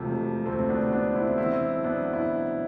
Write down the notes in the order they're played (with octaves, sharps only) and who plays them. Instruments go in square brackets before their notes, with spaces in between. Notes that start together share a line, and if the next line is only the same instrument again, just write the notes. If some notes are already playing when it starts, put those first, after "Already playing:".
Already playing: [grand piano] E1 C3 F3 A3
E1
D2 A3 C4
B3 D4
C3
B3 D4
E1
C4 E4
E3 C4 E4
B1
B3 D4
B1
E4